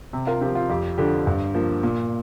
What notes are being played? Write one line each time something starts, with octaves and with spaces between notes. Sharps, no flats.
C3
F4 A#4
F3 C4 G4
F4
F2 G4
D3 F3 G4
G2
F3 A#3
A#2